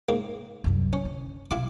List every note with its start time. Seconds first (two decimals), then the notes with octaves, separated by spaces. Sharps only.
0.09 G#2 A#3
0.64 C2 F#2
0.93 C#4
1.05 D3
1.51 B1 E4 F5 D6